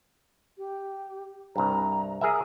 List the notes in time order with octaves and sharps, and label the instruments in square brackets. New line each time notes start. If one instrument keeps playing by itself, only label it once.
[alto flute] G4
[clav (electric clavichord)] C2 G2 [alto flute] A#5
[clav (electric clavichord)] G#4 A#4 E5